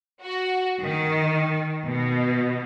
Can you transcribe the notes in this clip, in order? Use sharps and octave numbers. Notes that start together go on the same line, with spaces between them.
F#4
D#3
B2